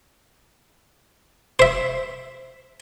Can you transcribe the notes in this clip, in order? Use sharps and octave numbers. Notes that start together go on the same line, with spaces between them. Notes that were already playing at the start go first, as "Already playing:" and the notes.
C5 E5